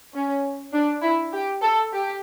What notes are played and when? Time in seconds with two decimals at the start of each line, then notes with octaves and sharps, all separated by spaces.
0.14 C#4
0.73 D4
1.03 E4
1.33 G4
1.62 A4
1.93 G4